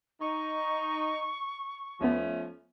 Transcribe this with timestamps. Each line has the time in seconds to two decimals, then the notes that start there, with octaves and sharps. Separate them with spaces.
0.21 D#4 C#6
2.01 D#2 F3 A3 B3 C#4